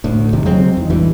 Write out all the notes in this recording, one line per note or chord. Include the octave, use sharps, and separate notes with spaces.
D2 A2
E2 C3 D#3
C#3 F#3 G#3 C4
E2 D#3
A1 G2 E3